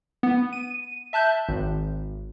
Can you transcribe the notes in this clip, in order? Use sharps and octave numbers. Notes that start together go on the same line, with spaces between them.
B3
D#7
E5 A5 F#6 G6
G#1